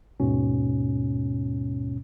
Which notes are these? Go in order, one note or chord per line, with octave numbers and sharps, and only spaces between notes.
D#2 G#2 B2 C#4